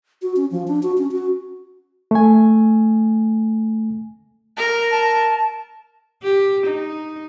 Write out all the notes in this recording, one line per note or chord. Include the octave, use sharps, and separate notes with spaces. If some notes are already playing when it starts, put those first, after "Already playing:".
F#4
C#4
F3
D4
F#4
C#4
F#4
A3 G#5
A#4
A5
G4
D#4